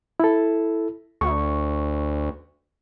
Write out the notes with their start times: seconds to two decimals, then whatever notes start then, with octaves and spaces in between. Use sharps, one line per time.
0.20 E4 A4
1.21 D2 C#6